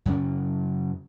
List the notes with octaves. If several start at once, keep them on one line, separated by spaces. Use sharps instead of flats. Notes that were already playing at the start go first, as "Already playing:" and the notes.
F#2 C#3 C#4